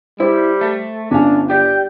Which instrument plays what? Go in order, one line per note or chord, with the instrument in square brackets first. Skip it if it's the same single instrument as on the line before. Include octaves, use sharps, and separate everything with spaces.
[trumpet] G3 [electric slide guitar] E4 [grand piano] C5
[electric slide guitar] A3 A4
[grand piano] G1 G#5 [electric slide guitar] C#4 F5 [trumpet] D4
[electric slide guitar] G4 D5 [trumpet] G5